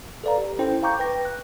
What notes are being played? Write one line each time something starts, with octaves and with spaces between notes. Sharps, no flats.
A4 B4 D5 F5 A#5
G4
C#4 E4 A4 C5 G5
F5 G5 A#5 C#6 D6 G6
B4 G5 A#6
F#6